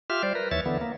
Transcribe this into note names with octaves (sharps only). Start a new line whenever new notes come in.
F4 G4 E5 F6
G3 C5 D5
A#4 B4
D#2 E3 C#5 E5 A6
D3 E3 B3
A#3